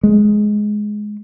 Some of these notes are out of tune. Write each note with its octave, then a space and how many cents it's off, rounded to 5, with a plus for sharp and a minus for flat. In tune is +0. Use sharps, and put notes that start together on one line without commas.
G#3 +10